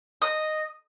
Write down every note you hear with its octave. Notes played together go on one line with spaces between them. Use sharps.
D#5 D#6